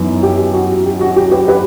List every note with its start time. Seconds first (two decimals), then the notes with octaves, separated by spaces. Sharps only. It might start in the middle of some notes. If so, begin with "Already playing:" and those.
Already playing: F#2 E3 B3 D#4
0.23 G4
0.54 F#4
0.86 G4
1.01 F#4
1.16 G4
1.32 G4 B4
1.48 G4 B4